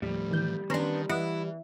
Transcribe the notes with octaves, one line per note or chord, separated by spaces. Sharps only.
D#2 A2 F3 G3
D#3 E3 G6
D#3 B3 C#4 D4 A#5 C6
E3 E4 B4 D#5 F#5